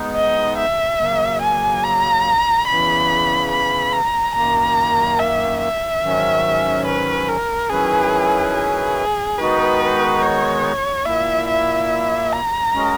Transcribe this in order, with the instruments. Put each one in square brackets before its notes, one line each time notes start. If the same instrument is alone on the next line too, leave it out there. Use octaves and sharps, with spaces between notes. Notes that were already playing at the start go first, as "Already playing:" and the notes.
Already playing: [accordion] G#3 B3 D#4
[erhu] D#5
E5
[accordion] C#3 F#3 A#3
[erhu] G#5
A#5
[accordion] E2 C#3 E3 [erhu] B5
[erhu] B5
A#5
[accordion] F#2 D#3 A#3 [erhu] A#5
[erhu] E5
E5
[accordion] G#2 D#3 F#3 C#4
[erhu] B4
A#4
[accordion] D#3 F#3 C#4 E4 B4 [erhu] G#4
[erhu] G#4
[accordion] D#3 G#3 B3 D#4 F#4 [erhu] B4
[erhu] C#5
[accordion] A#2 A#3 E4 [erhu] E5
[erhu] E5
A#5
[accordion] G#3 C#4 F#4 A#4 D#5